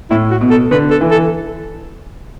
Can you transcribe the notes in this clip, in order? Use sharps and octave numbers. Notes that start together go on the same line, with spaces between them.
A2 E4
F#4
B2
A4
D3 B4
A4
E3
A4